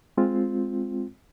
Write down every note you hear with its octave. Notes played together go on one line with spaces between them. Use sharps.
G#3 C4 F4